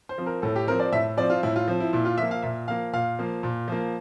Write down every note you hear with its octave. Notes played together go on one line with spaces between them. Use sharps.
C5
F3 C4
A#4
A2 A4
G4
F3 C4 A#4
D5
A2 E5
F3 C4 D5
F4
A2 E4
F4
F3 C4
E4
A#2 E4
F4
F3 A#3 E5
F5
A#2 E5
F3 A#3 F5
A#2 F5
F3 A#3
A#2
F3 A#3